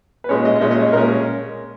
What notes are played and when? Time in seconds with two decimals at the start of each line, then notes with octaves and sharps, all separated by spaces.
0.24 B4
0.29 A#2 G#3 C#4 C#5
0.45 D#5
0.56 D#5
0.61 A#2 G#3 C#4 E5
0.71 D#5
0.82 C#5
0.93 A#2 G#3 C#4 A#4